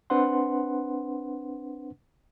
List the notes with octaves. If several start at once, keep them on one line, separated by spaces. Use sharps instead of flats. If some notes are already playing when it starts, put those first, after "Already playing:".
C4 D4 B4 C5 F#5 C6